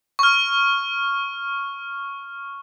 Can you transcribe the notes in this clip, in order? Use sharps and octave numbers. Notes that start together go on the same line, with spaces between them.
C#6 F6